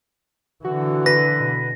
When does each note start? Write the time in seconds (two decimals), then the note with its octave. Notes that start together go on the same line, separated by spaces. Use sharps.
0.64 D3 E3 F#4
1.06 B4 A#6
1.40 B2